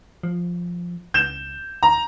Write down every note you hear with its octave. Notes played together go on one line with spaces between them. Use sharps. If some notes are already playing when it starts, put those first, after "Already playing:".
F3
C#2 G6 E7
D2 A#5